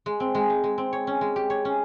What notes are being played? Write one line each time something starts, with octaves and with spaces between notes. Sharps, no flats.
G#3
C4
G#3
D#4
G#3
C4
C#5
C#4
G#3
G4
C#5
C#4